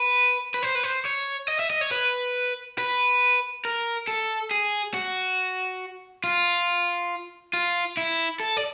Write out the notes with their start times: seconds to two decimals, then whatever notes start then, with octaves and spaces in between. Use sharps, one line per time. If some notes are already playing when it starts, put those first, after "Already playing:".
Already playing: B4
0.54 B4
0.63 C5
0.75 B4
0.83 C5
1.05 C#5
1.48 D#5
1.59 E5
1.70 D#5
1.81 C#5
1.91 B4
2.78 B4
3.65 A#4
4.08 A4
4.51 G#4
4.94 F#4
6.24 F4
7.53 F4
7.97 E4
8.40 A4
8.57 D5